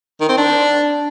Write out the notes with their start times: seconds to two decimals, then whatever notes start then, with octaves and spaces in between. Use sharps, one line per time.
0.21 D#3
0.29 C4
0.38 D4